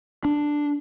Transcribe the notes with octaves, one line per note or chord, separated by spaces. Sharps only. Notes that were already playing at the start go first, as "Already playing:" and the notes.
D4